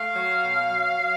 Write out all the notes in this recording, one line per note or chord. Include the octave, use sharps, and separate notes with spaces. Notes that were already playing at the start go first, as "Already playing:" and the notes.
Already playing: A3 F5
F#3
B2
F#3
F#3